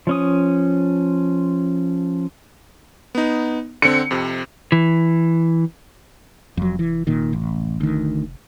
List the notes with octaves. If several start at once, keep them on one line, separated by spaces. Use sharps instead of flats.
F3 C#4 D#6
B3 D#4
D3 C4 C#7
F2 C3
E3
F1 F2 F#3
E3
A#2 D#3
A1
D2 D#3